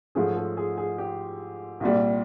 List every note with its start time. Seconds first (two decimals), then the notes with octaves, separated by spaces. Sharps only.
0.15 G#2 F3 A3 C#4 G#4
0.36 A4
0.57 G#4
0.77 G#4
0.98 G4
1.80 C2 A#2 G3